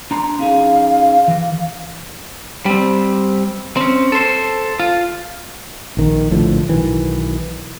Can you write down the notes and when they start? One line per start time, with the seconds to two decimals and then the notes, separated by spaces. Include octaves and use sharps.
0.11 D4 A#5 C6
0.39 C#4 D#4 G#4 F5
1.28 E3
2.66 G3 C4
3.77 C4 C#4
4.12 A4 C5
4.80 F4
5.97 A#1 D#3
6.31 A#1 A2 D3 F3
6.69 B1 D#3 E3